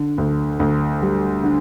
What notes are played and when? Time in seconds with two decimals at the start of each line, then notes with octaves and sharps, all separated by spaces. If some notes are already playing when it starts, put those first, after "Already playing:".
Already playing: D3
0.18 D2
0.60 D2
1.02 G3
1.43 D3